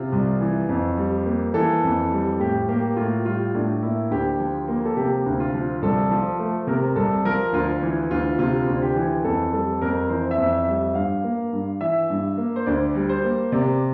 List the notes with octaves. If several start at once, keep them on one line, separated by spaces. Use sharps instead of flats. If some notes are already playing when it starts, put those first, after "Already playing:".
Already playing: C3 F4
C2
E3
F2
G3
A#3
E3 A4
F2
G3
A2 G4
A#3 G4
A2 F4
G3 F4
A2 D4
A#3 E4
D2 G4
F3
A#3
A4
C3 G4
D2
F4
F3
C2 A4
F3
A3
C3 A#4
C2 A4
F3 A#4
D2 F4
E3
D2 F4
C3 F4
D2
G4
E3
F2 A4
G3 A4
F2 A#4
E3 C5
E5
F2
E5
G3
E5
G2 F5
A#3
G2
E3 E5
G2
A#3
C5
D2 D5
G3
C5
A#3
C3 D5